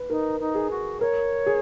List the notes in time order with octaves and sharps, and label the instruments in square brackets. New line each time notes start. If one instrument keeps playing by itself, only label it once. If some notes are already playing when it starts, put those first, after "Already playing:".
Already playing: [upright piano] B4
[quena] D#4 [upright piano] A#4
[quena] D#4
[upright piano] G#4
[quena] F#4
[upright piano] A#4 [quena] C#5
[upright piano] G#4